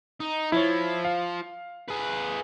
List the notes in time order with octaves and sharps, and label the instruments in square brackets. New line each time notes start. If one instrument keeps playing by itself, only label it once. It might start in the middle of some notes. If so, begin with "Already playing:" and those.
[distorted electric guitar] D#4
[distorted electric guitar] F3 [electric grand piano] E4 C#5
[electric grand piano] F5
[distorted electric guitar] G#4 B4